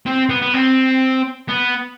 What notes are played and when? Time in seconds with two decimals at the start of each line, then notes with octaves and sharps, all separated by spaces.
0.06 C4
0.29 B3
0.42 B3
0.54 C4
1.49 B3